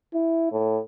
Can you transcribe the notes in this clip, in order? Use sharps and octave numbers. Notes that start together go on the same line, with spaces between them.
E4
A2